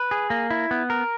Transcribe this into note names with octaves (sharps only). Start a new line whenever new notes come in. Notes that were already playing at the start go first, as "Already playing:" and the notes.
Already playing: B4
G#4
A#3
E4
B3
A#4